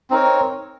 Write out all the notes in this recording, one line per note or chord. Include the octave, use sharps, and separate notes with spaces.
C4 D#4 A#4 C#5